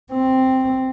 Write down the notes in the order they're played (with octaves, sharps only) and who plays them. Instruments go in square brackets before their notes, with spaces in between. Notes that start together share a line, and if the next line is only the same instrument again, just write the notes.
[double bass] C4